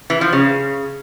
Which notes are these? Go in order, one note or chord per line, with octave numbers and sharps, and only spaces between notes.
E3
F3
C#3